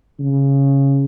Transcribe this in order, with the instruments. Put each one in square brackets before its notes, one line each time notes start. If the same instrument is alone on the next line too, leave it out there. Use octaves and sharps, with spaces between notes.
[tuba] C#3